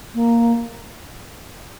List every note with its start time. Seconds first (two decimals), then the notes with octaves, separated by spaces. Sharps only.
0.14 A#3